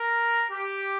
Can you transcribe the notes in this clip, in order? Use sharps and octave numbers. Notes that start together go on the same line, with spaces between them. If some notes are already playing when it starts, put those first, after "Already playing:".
Already playing: A#4
G4